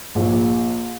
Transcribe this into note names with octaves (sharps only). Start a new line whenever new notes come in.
A#1